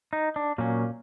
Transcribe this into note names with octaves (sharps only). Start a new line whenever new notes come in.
D#4
D4
A#2 F#3 A#3 C#4